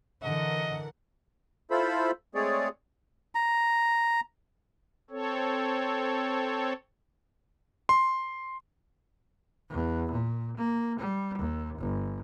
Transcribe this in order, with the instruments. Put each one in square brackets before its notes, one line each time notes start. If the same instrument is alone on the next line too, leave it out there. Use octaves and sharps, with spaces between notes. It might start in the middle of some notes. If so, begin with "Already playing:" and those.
[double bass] D3 [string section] E3 A#4 F#5 [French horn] D#5
[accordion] E4 F4 A4 C5 B5
G#3 A3 C4 G#4 C#5 D5
[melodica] A#5
[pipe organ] C4 A4 C#5
[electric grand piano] C6
[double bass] E2
A#2
A#3
G3
D#2
G1